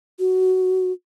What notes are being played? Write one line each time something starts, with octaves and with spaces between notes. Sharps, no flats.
F#4